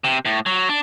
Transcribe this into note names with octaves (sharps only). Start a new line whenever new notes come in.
C3
A2
F#3
D4